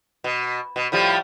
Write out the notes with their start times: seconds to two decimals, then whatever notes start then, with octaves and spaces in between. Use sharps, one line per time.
0.24 B2
0.76 B2
0.92 A2 F3 G3